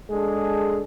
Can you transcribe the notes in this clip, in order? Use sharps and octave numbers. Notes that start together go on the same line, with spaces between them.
G#3 D4 G#4 A4